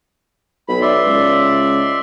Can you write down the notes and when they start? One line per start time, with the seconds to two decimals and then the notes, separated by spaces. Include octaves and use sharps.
0.69 B1 B5
0.82 D5 E5 C6
1.06 C#2